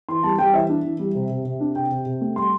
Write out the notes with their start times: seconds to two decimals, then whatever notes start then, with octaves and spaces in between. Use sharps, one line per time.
0.09 E3 C6
0.23 G3 A5
0.38 G3 G5
0.54 E3 E5
0.69 D4
0.84 E3
0.99 G3
1.15 C3
1.30 C3
1.45 C3
1.60 D4
1.75 C3 G5
1.91 C3
2.06 C3
2.21 A3
2.36 G3 C6